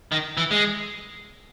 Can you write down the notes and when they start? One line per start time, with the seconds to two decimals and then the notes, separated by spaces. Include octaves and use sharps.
0.12 D#3
0.37 E3
0.51 G#3